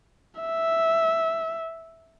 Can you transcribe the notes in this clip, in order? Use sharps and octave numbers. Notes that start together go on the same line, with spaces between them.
E5